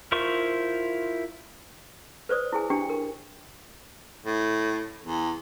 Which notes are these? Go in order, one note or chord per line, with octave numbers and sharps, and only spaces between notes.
E4 F4 A#4 C5 C#6
B4 C5 D5 D#6
E4 G#4 G#5
D4 G4 G5
A#4
A2
E2